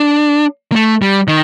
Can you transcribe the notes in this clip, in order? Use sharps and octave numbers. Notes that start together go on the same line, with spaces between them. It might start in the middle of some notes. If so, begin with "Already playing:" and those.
Already playing: D4
A#3
A3
G3
D#3